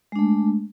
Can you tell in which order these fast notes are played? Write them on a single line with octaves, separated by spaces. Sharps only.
G#3 D4 A3